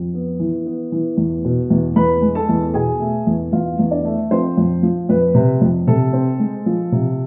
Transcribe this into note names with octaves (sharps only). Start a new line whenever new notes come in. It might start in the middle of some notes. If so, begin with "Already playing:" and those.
Already playing: F2
B3
E3
B3
E3
E2
B2
E2
E2 B4 B5
G#3
A4 A5
E2
B2 G#4 G#5
A3
E2
E2 F4 F5
E2
D4 D5
A3
F3 C4 C5
F2
F3
F2 B4
C3
F2
C3 A4
C4
G#3
F3
C3